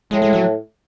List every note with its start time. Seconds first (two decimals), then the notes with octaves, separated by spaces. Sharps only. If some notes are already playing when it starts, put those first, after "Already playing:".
0.11 A2 G#3
0.22 G#3
0.33 F#3